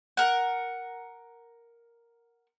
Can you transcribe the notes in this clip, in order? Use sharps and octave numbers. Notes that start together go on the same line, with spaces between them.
A#4 F#5